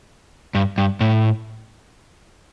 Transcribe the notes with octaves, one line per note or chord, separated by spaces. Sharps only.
G2
G2
A2